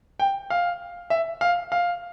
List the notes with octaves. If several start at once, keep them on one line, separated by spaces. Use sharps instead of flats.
G5
F5
E5
F5
F5